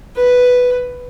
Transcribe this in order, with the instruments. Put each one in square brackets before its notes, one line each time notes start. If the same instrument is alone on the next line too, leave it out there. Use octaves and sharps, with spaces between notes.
[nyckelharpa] B4